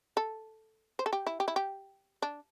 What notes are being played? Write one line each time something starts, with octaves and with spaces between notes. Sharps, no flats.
A4
C5
A4
G4
E4
G4
E4
G4
D4